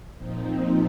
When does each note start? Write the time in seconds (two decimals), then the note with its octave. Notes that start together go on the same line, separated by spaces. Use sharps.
0.17 A#2 F3 C4 D#4